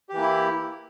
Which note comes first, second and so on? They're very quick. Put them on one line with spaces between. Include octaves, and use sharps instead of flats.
G4 E3 A#3 E4